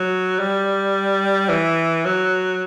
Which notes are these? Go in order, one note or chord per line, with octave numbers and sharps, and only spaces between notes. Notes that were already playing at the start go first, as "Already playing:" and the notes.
Already playing: F#3
G3
E3
F#3